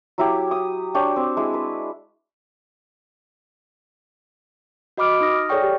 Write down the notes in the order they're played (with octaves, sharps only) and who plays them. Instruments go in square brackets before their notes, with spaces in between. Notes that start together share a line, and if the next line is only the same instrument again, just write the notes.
[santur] F#3 E4 G4
D#6
D4 F#4 G4 C#5
C4
G#3 E4
B4
[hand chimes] F#4 D#5 B5 D6 F6 D7
D#4 D#6 A#6
F6
G#4 A4 C#5 D5 G5 C#6
G4